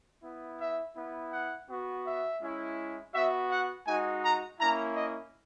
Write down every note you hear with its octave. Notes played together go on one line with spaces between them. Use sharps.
B3 E4
E5
B3 E4
F#5
B3 F#4
E5
G#3 C#4 E4
B3 F#4 E5
F#5
G#3 D#4 F#4 G#5
A#5
A#3 C#4 E4 A#5
D#5